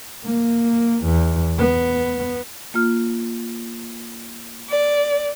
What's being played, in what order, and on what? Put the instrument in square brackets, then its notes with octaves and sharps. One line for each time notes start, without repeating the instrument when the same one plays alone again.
[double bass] A#3
E2
B3
[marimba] A#3 F4 F6
[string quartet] D5